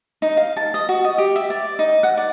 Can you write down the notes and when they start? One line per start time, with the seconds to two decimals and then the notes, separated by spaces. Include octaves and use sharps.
0.22 D#4
0.37 F5
0.57 A5
0.74 D#5
0.89 F#4
1.04 D#5
1.18 G4
1.36 E5
1.50 D5
1.79 D#4
2.03 F#5
2.17 D5